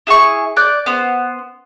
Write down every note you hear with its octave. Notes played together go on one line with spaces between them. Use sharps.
E4 G#4 G#5 C#6
D5 F#6 G6
B3 C5